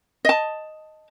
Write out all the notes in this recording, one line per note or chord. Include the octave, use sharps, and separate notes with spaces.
D#5 A5